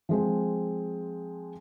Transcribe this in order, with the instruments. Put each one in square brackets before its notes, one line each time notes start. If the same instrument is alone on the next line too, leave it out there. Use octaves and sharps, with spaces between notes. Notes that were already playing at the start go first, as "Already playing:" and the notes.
[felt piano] F3 G#3 C4